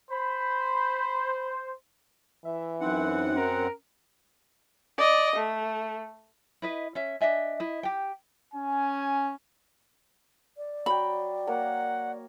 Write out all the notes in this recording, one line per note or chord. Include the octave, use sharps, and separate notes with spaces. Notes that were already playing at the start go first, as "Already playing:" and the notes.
C5 B5
E3 E5
F#2 C4 D#4 F#5
C#4 A#4
D5 D#5
A3
E4 B4 D#5
C#4 E5
D4 D#5 E5 G#5
E4 D#5
G4 G5
C#4 G#5
D5
F#3 G5 B5
A#3 A#4 C#5 F#5